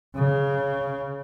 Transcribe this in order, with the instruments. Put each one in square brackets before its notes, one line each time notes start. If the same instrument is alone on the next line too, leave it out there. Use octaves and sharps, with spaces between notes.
[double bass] C#3